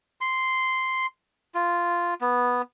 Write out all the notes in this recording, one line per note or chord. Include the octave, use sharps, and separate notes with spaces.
C6
F4
B3